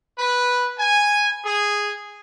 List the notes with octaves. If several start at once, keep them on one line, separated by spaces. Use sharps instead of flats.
B4
G#5
G#4